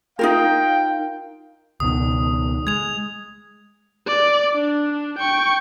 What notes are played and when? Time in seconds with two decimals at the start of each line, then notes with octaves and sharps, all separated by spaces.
0.19 D#4 F4 A#4 F5 G5
1.80 C#2 B2 D#3 D#6
2.67 G#3 G#6 F7
4.07 D5
4.55 D4
5.19 G5 C#6